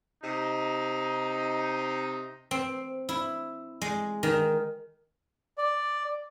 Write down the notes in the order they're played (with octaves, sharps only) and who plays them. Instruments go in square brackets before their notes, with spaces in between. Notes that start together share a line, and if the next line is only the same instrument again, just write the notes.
[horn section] C3 D#4
[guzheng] C4
E4
G#3
D#3
[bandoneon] D5